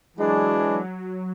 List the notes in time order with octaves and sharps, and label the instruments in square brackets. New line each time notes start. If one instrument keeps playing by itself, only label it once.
[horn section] E3 G#3 D4 [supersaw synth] F#3